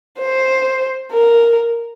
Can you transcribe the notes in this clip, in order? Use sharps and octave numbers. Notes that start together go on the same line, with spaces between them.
C5
A#4